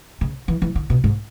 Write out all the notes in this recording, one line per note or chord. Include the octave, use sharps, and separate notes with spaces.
C#3
E3
E3
D3
B2
G#2